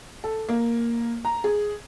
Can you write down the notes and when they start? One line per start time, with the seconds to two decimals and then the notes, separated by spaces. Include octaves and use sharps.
0.24 A4
0.49 A#3
1.25 A#5
1.44 G#4